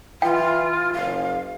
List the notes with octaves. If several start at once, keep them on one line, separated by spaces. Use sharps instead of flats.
E3 F4 G5
F#1 F5